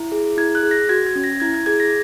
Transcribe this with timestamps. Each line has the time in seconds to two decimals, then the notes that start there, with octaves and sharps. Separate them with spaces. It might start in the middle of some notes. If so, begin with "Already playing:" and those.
Already playing: E4
0.12 G#4
0.37 E4 G#6
0.55 F#6
0.63 G#4
0.71 A#6
0.89 F#4 G#6
1.07 G#6
1.16 C#4
1.24 A#6
1.40 E4 G#6
1.54 G#6
1.66 G#4 G#6
1.80 A#6